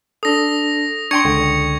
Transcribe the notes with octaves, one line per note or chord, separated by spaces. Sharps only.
D4 A4 D#6 A#6
D4 G5 C6 C#6 G#6 C#7
C#2 D3 G5